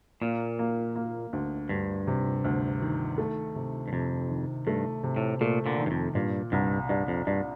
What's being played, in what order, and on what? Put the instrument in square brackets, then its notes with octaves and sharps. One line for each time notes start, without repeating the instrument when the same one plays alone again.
[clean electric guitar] A#2 [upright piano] A#3
[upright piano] A#3
A#3
D2
[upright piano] D2 [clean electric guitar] G2
[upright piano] C3
D2
D#3
A3
C3
[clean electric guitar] G2
[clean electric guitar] F2 [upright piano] C3
[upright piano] D#3
[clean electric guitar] G2 [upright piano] A3
[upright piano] C3
[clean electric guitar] A2
[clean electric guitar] A#2 [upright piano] A3
[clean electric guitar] A#2 D3
[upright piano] D#3
[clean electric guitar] G2
F2
[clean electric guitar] G2 [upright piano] A#2
[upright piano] C2 [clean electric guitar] G2
[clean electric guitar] G2 [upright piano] D4
[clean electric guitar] F2
[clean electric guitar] G2 [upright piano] D4